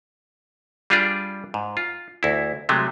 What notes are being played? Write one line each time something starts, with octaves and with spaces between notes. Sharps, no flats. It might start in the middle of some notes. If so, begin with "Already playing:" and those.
G3 D4 F4 G4 G#4
G#2
F4
D2 E4
C3 F#3 G#3 A3